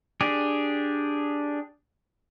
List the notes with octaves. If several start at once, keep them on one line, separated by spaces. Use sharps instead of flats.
D4 G4 G#4